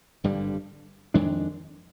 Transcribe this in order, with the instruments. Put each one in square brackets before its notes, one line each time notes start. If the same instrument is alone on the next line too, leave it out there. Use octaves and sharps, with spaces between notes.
[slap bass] G#1 G2 D3 G3
F2 D#3 G#3 D4